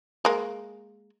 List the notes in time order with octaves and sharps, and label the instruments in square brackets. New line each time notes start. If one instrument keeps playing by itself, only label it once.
[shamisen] G#3 A#3